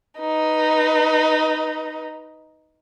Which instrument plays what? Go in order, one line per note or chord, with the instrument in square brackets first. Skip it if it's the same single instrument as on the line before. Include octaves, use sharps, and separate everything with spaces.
[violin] D#4 B4